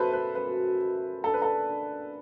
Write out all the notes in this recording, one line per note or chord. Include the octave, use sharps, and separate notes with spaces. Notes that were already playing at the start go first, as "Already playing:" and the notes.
Already playing: F#2 A3 A4 B4 C5
B4
F#2 B4
A3
D4 A4
B4
A4
D3